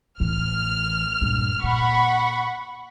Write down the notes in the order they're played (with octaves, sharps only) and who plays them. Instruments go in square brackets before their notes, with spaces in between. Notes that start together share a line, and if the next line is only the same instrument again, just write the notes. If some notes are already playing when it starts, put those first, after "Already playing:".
[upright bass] A1 E3 [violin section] F6
[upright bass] G2 A#2
[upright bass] A#2 [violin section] F#5 B5 C#6